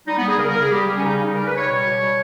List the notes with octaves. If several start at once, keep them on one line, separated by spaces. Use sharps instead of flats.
G3 D#4
G3 B3
G#4
C#3 A#4
C#3 A#4
G#4
G3 G4
G3
C#4
C#3 D#4
C#3
G3 A#4
B4
G3 C#5
B2 C#5
B2
G3